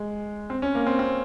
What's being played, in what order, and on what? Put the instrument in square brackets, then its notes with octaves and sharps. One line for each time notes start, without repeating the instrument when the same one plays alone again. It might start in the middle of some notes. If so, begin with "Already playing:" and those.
Already playing: [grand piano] G#3
C4
C#4
A#3
C4
C4